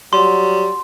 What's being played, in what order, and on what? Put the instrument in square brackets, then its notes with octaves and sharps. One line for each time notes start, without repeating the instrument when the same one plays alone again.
[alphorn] F#3 [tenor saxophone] G3 [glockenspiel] C6